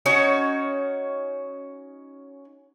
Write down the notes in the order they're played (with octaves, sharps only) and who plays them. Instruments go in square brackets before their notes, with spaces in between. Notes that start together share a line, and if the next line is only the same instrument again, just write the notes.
[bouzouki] C#4 D#4 F#4 C#5